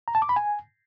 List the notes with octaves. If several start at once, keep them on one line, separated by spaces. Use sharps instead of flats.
A#5
A5
D6
B5
G#5